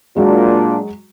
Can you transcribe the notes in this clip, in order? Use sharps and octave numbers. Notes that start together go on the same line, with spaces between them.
A#2 F#3 G#3 D4